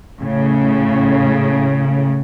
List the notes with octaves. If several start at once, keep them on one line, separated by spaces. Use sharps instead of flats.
A2 C#3